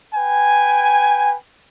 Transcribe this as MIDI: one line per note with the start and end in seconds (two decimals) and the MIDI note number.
0.15 1.35 71
0.15 1.35 79
0.15 1.35 80